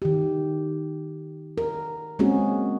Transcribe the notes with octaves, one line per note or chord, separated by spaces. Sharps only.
D#3 G4
A#4
G#3 A#3 C4 C#4 F#4 G#4